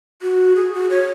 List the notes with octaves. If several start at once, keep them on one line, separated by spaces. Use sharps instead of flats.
F#4
G#4
F#4
C#5